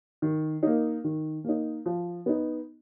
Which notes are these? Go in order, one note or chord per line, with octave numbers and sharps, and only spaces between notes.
D#3
A#3 D#4
D#3
A#3 D#4
F3
B3 D#4